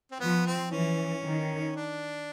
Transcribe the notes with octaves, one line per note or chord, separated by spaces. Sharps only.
C4
F3 B3
C4
E3 C#4
D#3
D4